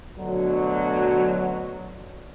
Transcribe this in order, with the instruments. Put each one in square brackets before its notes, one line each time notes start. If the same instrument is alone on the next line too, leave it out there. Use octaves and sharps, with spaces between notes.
[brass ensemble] D2 B2 D3 F#3